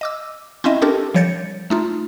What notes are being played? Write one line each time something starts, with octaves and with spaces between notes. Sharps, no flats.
D#5 D6 E6
C4 C#4 E4 D#5 E5
C4 D4 G4 A4 A#4
F3 G3 C#5 G6 A6 C#7
A3 D#4 F4